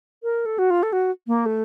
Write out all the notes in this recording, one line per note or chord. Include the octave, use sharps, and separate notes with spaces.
A#4
A4
F#4
F4
A4
F#4
A#3
A3